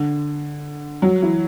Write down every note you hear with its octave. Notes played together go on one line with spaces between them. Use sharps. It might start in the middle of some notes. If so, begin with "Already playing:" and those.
Already playing: D3
F#3
E3